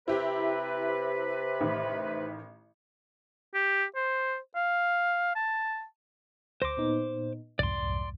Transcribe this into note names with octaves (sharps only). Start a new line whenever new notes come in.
C3 E4 G4 B4
A1 D#3
G4
C5
F5
A5
D2 C5 C6 D6 A#6
A#2 B3 D#4
C2 F2 G#2 D5 C6